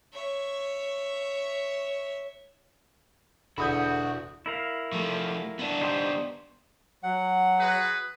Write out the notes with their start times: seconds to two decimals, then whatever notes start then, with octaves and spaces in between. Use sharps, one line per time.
0.13 C#5 E5
3.58 E1 D3 E4 F#4 B5 D#6 G6
4.46 E4 A#4 F5
4.92 F3 A3
5.59 B3 D4
5.81 D#4 G4 C5
7.03 F#3 F#5
7.59 F#4 G#4 B4